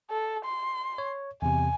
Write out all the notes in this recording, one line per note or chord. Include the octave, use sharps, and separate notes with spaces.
A4
C6
C#5
E2 C3 G#5